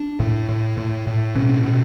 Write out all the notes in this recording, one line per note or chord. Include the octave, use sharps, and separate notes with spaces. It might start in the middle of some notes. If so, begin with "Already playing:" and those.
Already playing: D4
A2
A2
A2
A2
B2 C#4
B2